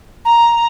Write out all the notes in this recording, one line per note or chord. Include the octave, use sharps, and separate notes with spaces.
A#5